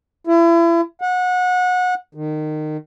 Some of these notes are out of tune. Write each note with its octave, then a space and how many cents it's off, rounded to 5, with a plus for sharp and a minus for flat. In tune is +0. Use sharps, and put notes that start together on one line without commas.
E4 +35
F#5 -25
D#3 -25